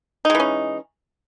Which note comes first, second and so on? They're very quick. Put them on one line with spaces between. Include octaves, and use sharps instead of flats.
D#4 G#3 E3 C#4